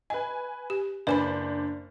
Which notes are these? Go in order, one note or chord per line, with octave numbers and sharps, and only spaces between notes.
B4 D#5 G#5
G4
F#1 D4 B4 C5 G#5 B5